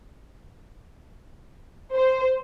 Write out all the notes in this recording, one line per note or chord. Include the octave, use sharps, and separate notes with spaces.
C5